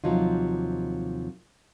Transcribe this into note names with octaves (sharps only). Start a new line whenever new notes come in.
D#2 C3 F3 F#3 D#4 F4